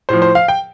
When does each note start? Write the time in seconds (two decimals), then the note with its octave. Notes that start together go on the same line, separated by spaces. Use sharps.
0.09 A2 F3 C5
0.22 C5
0.35 F5
0.48 G5